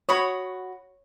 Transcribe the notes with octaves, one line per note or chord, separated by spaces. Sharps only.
F#4 C#5 B5 D#6